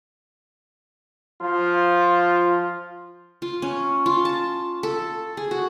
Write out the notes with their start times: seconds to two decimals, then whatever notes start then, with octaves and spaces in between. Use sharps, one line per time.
1.41 F3 F4
3.42 F4
3.62 C#4
4.06 F4
4.25 A5
4.83 A4
5.37 G#4
5.51 F#4